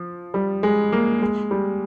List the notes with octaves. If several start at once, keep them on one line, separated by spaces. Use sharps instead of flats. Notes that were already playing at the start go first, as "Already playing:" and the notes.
Already playing: F3
G3
G#3
A#3
G#3
G3